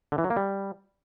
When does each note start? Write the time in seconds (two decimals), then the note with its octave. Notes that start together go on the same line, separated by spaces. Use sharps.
0.12 D3
0.18 E3
0.24 F#3
0.30 A#3
0.36 G3